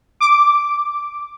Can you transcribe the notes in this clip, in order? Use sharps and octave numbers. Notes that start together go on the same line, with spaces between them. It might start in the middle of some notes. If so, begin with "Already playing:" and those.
D6